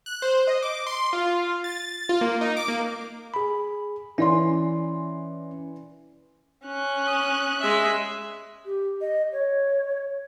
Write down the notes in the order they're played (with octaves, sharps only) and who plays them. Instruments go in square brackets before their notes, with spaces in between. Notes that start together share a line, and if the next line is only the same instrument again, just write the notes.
[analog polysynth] F#6
C5
D#5
D6
C6
F4
A6
F4
A#3
D#4
D6
A#3
[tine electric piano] G#4 B5
[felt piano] E3 C6 [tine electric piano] C#4 D5
[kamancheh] C#4 F#6
[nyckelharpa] D#6
G#3 E5
[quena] G4
D#5
C#5